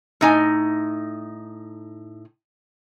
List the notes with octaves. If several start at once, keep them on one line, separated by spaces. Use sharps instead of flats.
A2 D#4 G#5